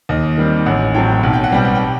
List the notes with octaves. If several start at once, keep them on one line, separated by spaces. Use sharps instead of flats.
D#2 D#5
D#3 G3 C4
A1 F#5
A2 F#3 C4 G5
B1 F#5
G5
F#5
B2 G3 C4 G5
F#5
G5